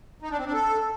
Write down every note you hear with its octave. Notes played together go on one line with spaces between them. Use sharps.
D#4
D4
C4
D4
A4